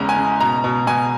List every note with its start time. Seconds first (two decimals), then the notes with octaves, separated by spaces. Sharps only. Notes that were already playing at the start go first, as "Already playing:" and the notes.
Already playing: E2 C#3 G#3 A#5
0.09 G#5
0.16 C#3
0.40 B2 A#5
0.64 B2
0.87 B2 G#5